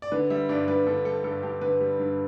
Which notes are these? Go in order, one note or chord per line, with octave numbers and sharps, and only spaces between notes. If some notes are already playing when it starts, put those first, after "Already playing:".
D5
D3 B4
G3 E5
G2 D5
G2 B4
D3 A4
G3 A4
G2 A4
G2 G4
D3 B4
G3
G2